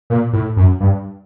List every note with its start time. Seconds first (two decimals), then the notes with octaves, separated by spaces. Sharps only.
0.10 A#2
0.33 A2
0.57 F#2
0.80 G2